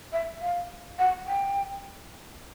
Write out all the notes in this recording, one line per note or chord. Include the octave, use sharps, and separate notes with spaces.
E5
F5
F#5
G5